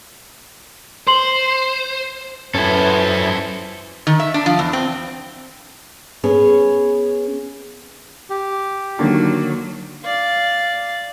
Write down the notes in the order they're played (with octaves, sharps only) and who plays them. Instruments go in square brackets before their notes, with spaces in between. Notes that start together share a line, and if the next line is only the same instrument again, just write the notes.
[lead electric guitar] C5 [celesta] C6 F#7
[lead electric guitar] F#2 [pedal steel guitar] C#4 E4 [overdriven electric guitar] A4 C5 [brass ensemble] B4
[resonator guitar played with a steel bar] D#3
E5
D4
F3
E2
C4
[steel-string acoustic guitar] B3 C#4 G#4 C#5
[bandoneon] G4
[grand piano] D3 D#3 A#3 [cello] F#3
[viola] D5 F5